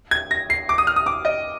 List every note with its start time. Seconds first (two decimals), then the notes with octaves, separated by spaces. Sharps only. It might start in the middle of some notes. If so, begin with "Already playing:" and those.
0.11 G#6
0.31 A#6
0.50 C7
0.69 D6
0.78 D#6
0.87 F6
0.96 D#6
1.06 D6
1.25 D#5